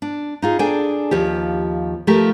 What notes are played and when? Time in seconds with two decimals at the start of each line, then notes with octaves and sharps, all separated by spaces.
0.02 D4
0.42 D#4 F4 G#4
0.59 D4 G#4 A4 G5 G#5
1.11 D#2 F3 G4
2.07 F3 A3 F4 G4 A#4